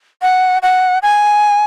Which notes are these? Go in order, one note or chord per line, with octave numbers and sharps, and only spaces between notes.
F#5
F#5
G#5